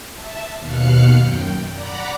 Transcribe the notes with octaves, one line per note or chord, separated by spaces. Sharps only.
E5 A5
D#2 B2 F5 F6 F#6 C#7
F#2 G5
D5 F#5 A#5 B5 D6